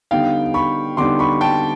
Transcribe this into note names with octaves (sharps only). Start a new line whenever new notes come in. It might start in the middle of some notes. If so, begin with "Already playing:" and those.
D3 G3 B3 D#4 F5 G5
B5 C#6
D3 G3 B3 D#4 C6 D6
B5 C#6
G5 A5